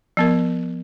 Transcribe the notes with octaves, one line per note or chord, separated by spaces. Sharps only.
F3 B3 A#4